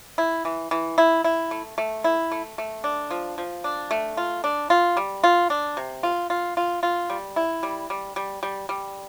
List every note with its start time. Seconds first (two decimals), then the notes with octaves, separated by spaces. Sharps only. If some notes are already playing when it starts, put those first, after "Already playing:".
0.18 E4
0.45 E3
0.71 E3
0.98 E4
1.24 E4
1.51 A3
1.78 A3
2.04 E4
2.32 A3
2.58 A3
2.84 D4
3.11 F3
3.38 F3
3.64 D4
3.91 A3
4.17 F4
4.44 D4
4.70 F4
4.97 G3
5.24 F4
5.50 D4
5.77 C3
6.03 F4
6.30 F4
6.57 F4
6.83 F4
7.10 G3
7.36 E4
7.63 G3
7.90 G3
8.16 G3
8.43 G3
8.69 G3